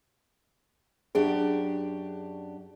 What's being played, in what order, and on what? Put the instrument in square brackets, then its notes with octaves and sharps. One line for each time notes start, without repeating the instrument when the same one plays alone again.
[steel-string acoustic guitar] F#2 D4 G4 [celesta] G#4